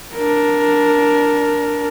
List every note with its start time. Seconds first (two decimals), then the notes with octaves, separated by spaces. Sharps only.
0.14 D4 A#4